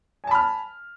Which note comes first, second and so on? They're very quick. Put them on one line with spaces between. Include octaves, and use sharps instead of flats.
G#5 A5 B5 F6